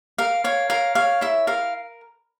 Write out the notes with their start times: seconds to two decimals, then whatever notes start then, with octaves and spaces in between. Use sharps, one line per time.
0.18 A#4 F5
0.44 C#5 F5
0.70 A#4 F5
0.95 C#5 F5
1.21 E4 E5
1.47 A#4 F5